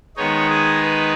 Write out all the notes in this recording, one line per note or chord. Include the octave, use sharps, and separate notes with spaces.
D#3 G#3 B3 D#4 C#5
G#4
B4